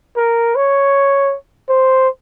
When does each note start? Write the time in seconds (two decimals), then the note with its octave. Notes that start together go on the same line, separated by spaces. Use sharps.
0.17 A#4
0.55 C#5
1.69 C5